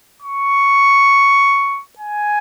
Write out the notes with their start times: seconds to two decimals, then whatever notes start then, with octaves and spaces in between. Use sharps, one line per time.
0.22 C#6
1.99 G#5